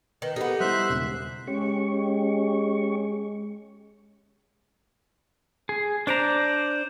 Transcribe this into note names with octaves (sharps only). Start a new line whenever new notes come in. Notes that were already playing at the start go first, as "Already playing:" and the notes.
D#3 B4
B3 D#4 G4 A4 A#4
G3 E4 C5 E5 F#6
E1 C#3 C#4
G#3 C#4 G4 C#6
G#4
D4 C5 D5 A#5